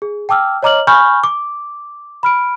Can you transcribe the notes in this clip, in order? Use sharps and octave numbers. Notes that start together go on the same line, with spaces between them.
G#4
G5 A5 D6 E6 F6
C#5 D#5 A#5 D6 F6 F#7
G#5 B5 C#6 F6 G6
D6
B5 F6 D7